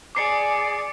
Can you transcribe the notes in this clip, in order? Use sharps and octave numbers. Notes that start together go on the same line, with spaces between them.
G#4 D5 D6 C7 C#7